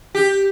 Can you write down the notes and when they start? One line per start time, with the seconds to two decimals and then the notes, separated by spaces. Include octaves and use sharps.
0.15 G4